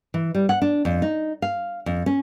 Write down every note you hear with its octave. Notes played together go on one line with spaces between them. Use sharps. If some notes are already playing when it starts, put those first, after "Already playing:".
E3
G3
F#5
D4
F2
D#4
F5
F2
C#4